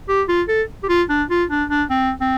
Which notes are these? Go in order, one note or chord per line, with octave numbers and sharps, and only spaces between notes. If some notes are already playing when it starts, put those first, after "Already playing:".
G4
F4
A4
G4
F4
D4
F4
D4
D4
C4
C4